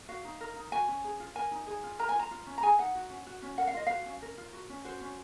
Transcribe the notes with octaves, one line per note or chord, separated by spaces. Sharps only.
F#4 F5
D#4
A#4
D#4
F#4 G#5
C#4
G#4
F4
A#4 G#5
D#4
G#4
F4
A#4 A#5
G#5
F4 A#5
F4
C#4
A#5
G#4 G#5
D#4 F#5
F#4
C#4
F#4
C#4
A#4 F#5
F5
F4 D#5
F#4 F5
C#4
A#4
F4
F#4
C#4
F#4 C5
C#4